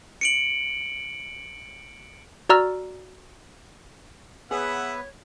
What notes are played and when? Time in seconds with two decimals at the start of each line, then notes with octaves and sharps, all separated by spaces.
0.21 C#7 D7 F#7
2.50 F#4 D5 A#5 E6 F6
4.51 B3 G#4 B4 C#5 E5 F#5